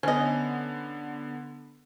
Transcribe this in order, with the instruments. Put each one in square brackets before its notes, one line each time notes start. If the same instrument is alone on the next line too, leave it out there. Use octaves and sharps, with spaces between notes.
[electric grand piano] D3 B3 [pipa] C#4 D#5